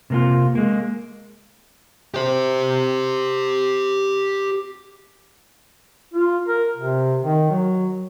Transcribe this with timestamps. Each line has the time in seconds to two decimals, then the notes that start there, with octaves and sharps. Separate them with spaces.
0.10 C3 A#3 F4
0.55 G#3 A#3
2.14 G4 C5
6.14 F4
6.48 A#4
6.77 C3
7.22 D#3
7.50 F#3